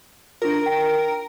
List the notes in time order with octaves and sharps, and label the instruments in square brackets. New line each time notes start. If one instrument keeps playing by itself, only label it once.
[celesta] D4 F4 [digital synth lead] A#4
[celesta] G5